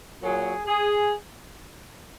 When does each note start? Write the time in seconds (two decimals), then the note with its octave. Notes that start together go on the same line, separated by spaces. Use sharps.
0.22 A#2 F#3 G#4
0.66 G#4